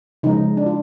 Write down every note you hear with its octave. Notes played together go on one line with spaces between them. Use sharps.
C#3 F3 G#3 D#4
D4
F4